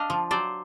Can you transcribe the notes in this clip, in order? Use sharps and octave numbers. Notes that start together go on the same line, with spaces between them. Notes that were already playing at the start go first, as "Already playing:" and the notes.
Already playing: D4 D#5 F5
F3
F#3 C5 D5